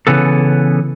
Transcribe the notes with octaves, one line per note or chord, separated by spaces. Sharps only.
C#3 E3 B3 A4